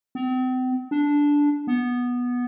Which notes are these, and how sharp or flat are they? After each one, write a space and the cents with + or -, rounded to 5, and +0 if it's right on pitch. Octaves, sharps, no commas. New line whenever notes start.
C4 -40
D4 -10
B3 -10